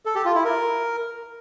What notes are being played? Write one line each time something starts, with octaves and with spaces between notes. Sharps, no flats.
A4
G4
F4
E4
A#4